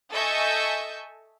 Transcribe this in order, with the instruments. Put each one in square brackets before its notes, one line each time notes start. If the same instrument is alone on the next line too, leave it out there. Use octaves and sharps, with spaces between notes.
[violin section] A4 D#5 E5 G#5 C#6 G6